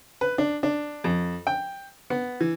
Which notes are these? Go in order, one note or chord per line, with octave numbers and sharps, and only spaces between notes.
B4
D4
D4
F2
G5
B3
E3